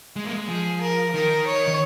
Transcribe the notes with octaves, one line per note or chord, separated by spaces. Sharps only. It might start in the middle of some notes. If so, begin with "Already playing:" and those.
G#3
A#3
G#3
F3 G#4
A#4
D#3 A#4
C#5
D#3